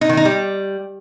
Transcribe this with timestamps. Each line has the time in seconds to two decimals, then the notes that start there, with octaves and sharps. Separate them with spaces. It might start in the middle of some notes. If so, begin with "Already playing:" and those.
0.01 D#4
0.09 D#3
0.17 D#4
0.25 G3